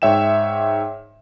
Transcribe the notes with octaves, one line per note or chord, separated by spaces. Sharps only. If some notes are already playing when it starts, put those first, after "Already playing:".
G#2 C#5 E5 G5 E7